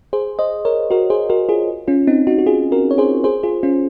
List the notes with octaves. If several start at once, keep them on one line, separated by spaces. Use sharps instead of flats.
G#4 C5
C5 D#5
A#4 C#5
F#4 A#4
G#4 C5
F#4 A#4
F4 G#4
C#4 F4
C4 D#4
D#4 F#4
F#4
F4 G#4
F#4 A#4
C#5
G#4 C5
G#4 C5
F4 G#4
C#4 F4